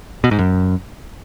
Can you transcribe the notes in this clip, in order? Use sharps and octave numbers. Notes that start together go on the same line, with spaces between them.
B2
G#2
F#2